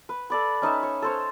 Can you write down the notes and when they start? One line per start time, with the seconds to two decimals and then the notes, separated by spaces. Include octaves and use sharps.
0.09 B4
0.30 A4 D5 B5
0.62 C#4 D#4 B4 E5
0.83 C#5
1.02 A4 C5 C#5